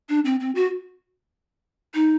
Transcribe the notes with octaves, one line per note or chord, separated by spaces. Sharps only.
D4
C4
C4
F#4
D#4